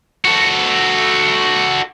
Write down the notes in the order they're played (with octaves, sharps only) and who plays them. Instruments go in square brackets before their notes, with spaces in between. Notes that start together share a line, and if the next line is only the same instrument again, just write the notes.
[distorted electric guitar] F#4 A4